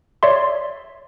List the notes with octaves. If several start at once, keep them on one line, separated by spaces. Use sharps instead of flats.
C#5 D5 E5 C6